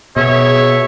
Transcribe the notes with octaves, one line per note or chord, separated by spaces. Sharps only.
B2 G#4 C#5 E5